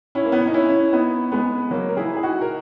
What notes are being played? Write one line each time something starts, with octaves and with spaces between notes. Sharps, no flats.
C#4 E4
A#3
B3
C#4
D#4
C#4 E4
B3 D#4
G#3 B3
F#3 A#3
A#4
E4 G#4
G#4
D#4 F#4
A#4